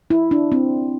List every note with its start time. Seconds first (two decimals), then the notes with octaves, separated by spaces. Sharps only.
0.10 E4
0.31 D4
0.52 C4